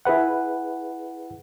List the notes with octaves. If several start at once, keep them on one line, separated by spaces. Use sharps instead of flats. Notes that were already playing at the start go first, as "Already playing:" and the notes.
E4 G#4 B4 F#5